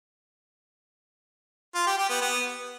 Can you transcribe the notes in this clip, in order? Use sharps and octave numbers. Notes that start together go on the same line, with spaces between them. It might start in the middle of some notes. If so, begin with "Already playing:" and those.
F4
G4
G4
B3
B3